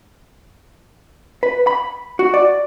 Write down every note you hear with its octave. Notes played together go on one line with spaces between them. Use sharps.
B4
B5
F#4
D5